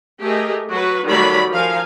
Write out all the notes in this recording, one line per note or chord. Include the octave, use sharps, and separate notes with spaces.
A3 G4 G#4 A#4 D#5
F#3 F#4 B4
D#3 F#3 G3 A3 D5 B5
F3 A#4 F5 G#5